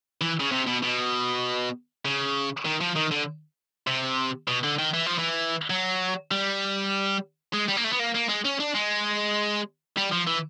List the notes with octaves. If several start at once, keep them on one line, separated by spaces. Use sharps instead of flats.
E3
C#3
C3
B2
B2
C#3
D#3
F3
D#3
D3
C3
B2
D3
D#3
E3
F3
E3
F#3
G3
G#3
G3
A#3
A3
B3
A#3
A#3
G#3
C#4
D4
G#3
G3
F3
E3